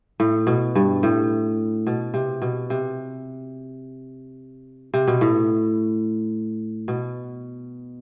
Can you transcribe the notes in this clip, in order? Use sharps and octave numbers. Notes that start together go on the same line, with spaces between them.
A2
B2
G2
A2
B2
C3
B2
C3
C3
B2
A2
B2